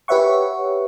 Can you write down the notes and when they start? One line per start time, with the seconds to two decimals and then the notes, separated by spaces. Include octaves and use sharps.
0.08 G4 B4 C#5 E5 F#5 C#6